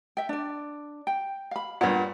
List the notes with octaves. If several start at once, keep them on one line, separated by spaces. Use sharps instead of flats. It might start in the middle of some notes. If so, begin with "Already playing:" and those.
E5 G5
D4 D5
G5
F5 B5
G2 A#2 C#5 D5 F#5